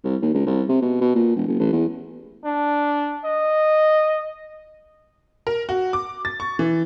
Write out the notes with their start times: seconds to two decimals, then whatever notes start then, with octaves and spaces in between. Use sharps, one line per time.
0.04 C2
0.22 D#2
0.34 C#2
0.47 C2
0.69 C3
0.82 B2
1.01 B2
1.15 A#2
1.36 E1
1.48 F#1
1.59 A1
1.73 E2
2.44 D4
3.25 D#5
5.47 A#4
5.69 F#4
5.93 D6
6.25 A6
6.40 C#6
6.59 E3